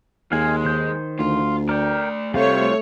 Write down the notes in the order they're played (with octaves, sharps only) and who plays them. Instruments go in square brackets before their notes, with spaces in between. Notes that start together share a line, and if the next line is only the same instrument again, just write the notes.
[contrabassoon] D#2 [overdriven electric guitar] G#3 [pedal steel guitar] F5 G#5
[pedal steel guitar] D#3 C5 G6
[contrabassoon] D2 [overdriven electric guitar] F4
[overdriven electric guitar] A3 D5 [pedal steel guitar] A#4 G5
[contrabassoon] C3 [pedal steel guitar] G3 F4 C5 [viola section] A3 C#5 [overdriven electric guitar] E4 F5